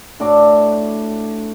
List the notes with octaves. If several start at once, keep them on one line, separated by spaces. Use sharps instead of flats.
A2 D4 F#4 D5